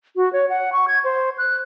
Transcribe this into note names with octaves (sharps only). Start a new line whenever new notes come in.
F#4
C#5
F#5
C#6
G#6
C5
F#6